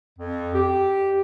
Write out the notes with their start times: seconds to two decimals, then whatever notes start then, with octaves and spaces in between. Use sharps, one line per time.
0.18 F2
0.54 G4